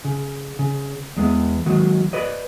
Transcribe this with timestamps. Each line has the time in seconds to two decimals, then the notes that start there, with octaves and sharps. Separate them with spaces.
0.05 C#3
0.59 C#3
1.17 E2 G#3 B3
1.66 D#3 F#3 G#3
2.13 B4 D5 D#5